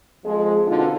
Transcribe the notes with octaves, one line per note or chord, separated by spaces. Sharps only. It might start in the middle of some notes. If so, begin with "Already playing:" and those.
F2 F3 G#3
B2 D3 C4 D#4 F4